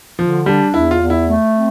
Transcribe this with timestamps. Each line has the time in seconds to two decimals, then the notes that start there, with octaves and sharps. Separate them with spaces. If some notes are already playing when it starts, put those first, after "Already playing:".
0.19 D3 F3
0.46 G3 D4
0.73 E2 E4
0.91 F4
1.00 E2
1.10 E4
1.28 A3
1.56 C4